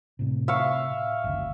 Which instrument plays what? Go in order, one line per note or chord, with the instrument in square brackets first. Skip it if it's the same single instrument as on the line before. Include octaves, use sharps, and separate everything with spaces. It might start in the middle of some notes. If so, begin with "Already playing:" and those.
[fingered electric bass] A2 C3
[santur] E5 F5 C#6
[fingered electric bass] F#1 D2